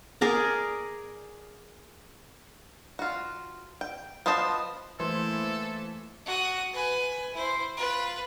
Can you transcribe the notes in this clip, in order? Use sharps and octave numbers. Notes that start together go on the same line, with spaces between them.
G#4 A#4 D5
F4 F#4
G5
B3 F4 C5 D#5 A5
E3 A3 A#3 E4 A4 C5 C6
F#4 D#6
B4 G#5
E4 C5
F4 B4